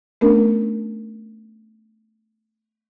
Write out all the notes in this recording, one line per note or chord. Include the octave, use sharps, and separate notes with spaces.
A3 B3 C#4 D4 A#4